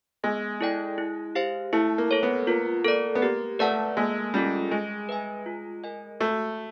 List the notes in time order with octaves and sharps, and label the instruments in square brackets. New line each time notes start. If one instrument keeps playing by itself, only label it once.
[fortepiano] G#3 [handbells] B3
[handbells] E4 A4 D5 G5
E4
G4 C5 F5
[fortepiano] A3 [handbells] E4
[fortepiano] A#3
[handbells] A4 C#5
[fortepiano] B3
[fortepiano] A#3 [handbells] F4
[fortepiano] A#3 [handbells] A4 D5
[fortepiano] B3
[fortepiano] A#3 [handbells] G4
[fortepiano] A3 [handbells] B4 D5 F#5 A5
[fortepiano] G#3 [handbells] A#3
[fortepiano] G3 [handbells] C#4 F4 A4
[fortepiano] G#3 [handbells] G#4
[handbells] B4 E5 G#5
F4
A#4 D#5 G#5
[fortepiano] A3 [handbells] F#4